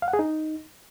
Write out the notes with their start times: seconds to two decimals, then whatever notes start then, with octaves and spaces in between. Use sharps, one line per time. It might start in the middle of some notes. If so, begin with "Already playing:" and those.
0.02 F5
0.08 F#5
0.13 G#4
0.19 D#4